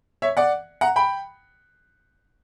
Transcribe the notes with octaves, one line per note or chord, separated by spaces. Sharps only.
C#5 E5
D5 F#5
F#5 A#5
G5 B5